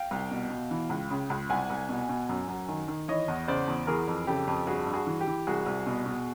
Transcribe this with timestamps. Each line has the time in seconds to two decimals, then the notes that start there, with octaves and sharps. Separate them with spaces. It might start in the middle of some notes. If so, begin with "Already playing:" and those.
Already playing: F5 G5
0.11 C2
0.31 B2
0.50 B2
0.71 E3
0.90 C#2
1.10 C#3
1.30 C#2
1.50 C2 F#5 G#5
1.70 C2
1.89 B2
2.09 B2
2.29 F#2
2.48 F#2
2.69 D#3
2.88 D#3
3.08 E3 C#5 D#5
3.28 E2
3.48 C#3 C5 D5
3.68 E2
3.87 E3 G#4 A#4
4.08 F2
4.27 C#3 G4 A4
4.47 F2
4.67 G2 F#4 G#4
4.87 G2
4.94 F#4 G#4
5.07 E3
5.21 G4
5.27 E3
5.47 C2 F#4 G#4
5.66 C2
5.86 B2
6.06 B2